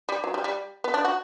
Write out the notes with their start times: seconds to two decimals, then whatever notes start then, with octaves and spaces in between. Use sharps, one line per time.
0.09 G3
0.24 F#3
0.34 G3
0.44 G3
0.84 B3
0.94 D4
1.05 F#4